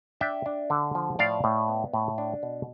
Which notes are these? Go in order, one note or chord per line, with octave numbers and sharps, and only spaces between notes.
D4 E5 G5
D4
D3
F3
A2 D5 F5
A2
B3
A2
D4
B2